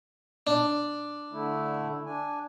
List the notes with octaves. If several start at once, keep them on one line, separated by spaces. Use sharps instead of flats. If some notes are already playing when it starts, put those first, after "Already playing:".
D4
D3 A3 E4
D4 G#5